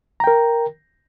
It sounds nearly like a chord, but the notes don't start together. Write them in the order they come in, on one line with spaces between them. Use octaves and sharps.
A#5 G5 A#4